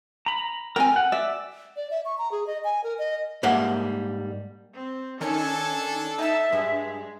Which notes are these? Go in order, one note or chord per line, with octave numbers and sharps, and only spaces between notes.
A#5 B5
C4 A4 A#4 G5 G#5
F#5
D5 E5
D5
E5
C#6
A#5
G#4
D#5
G#5
A#4
D#5
G#2 G3 A#3 E5 F#5
C4
D#3 C#4 D4 A4 G#5 C#7
D#4 E5 A5 E6
G2 G#3